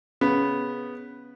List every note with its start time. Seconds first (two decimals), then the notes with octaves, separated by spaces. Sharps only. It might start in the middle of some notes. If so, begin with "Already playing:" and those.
0.21 C#3 B3